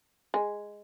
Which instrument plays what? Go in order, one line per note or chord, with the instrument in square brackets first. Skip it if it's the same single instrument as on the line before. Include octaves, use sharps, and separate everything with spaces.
[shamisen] G#3